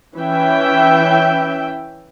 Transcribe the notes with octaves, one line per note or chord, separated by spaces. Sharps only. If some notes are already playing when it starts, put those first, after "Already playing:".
E3 C#4 E5 G5